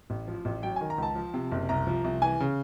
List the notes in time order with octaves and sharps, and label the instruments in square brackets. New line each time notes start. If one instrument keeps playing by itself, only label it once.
[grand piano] A1
F3
A1
F#3 G5
G#5
D#3
A#5
C#2 A5
F3
C3
F#1
C2 A#5
F3
C2
E3 G#5
C#3